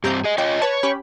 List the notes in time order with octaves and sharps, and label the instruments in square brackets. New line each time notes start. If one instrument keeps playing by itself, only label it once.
[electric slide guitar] G2 C4 [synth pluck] G4 A#5 G6
[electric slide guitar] G#4 D#5
[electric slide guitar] F4 C#5 D#5 [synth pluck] G5
[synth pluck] B4 A5 [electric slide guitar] C#5
[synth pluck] C#4 G4 B5